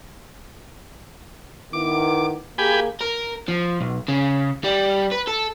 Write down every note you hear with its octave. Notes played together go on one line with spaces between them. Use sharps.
D#3 B3 E4 D6
A#3 G4 G#4 G#5 B5
A#4
F3
B1
C#3
G3
B4
A4